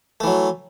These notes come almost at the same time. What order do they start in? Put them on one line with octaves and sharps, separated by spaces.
A3 E3 F#3